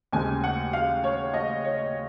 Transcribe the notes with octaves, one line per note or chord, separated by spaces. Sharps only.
D#2 C#3 G#3 C4 G#5
F#5
F5
C#5
D#5
C#5